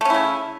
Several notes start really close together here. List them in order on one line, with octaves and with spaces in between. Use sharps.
A3 C#4 E4 C#3